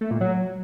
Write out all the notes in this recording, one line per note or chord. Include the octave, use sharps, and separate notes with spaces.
A3
A#2
F#3